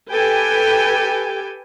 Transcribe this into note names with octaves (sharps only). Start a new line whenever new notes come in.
G4 A4 B4 G5 G#5